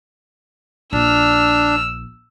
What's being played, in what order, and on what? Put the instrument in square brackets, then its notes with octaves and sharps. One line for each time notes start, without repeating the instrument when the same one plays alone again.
[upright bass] A#1 [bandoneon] D4 [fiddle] E6 F6